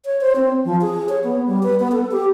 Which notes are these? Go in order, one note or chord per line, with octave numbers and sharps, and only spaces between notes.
C#5
C5
C4
F3
G#4
C#5
B3
G3
B4
B3
A4
G4